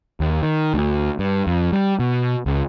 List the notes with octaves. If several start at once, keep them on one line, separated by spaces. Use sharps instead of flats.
D#2
D#3
D2
G2
F2
G3
B2
C#2